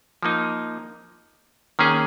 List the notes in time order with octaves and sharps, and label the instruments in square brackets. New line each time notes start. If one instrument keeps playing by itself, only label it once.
[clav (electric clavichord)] F3 A#3 D#4
D#3 A#3 C#4 G#4